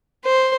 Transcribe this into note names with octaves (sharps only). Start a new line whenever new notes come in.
C5